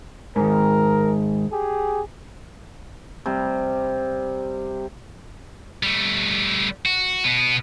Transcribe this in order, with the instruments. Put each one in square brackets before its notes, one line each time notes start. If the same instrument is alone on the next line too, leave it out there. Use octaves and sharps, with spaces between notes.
[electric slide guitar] G#2 D#3 [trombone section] A#4
[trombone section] G4 G#4
[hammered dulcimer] C3 G3
[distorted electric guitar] G3 A3
F#4
B2 B3